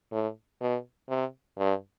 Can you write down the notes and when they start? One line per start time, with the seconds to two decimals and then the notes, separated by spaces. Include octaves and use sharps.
0.12 A2
0.61 B2
1.09 C3
1.59 G2